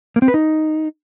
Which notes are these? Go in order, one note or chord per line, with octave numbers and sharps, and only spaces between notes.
A#3
C4
B4
D#4